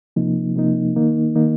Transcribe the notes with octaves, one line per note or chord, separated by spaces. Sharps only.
C3 F3 A#3 D#4
C3 F3 A#3 D#4
D#3 A#3 D#4
D#3 A#3 D#4